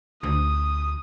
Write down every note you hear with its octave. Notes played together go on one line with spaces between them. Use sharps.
D2 D#6